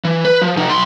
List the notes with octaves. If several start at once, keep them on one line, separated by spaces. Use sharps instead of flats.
E3
B4
F3
C3 D#4
B1 C6